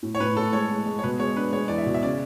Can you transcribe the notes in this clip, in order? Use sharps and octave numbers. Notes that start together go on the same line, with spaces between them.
A2
C#5
A2 B4
A2 A4
G#3 C#5
G#3
G#3
C#5
B2 B4
G#3 C#5
D4 B4
G#3 C#5
E2 D5
E5
B2
E5
C#3 D5